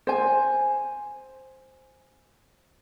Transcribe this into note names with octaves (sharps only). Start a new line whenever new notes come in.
C5 G#5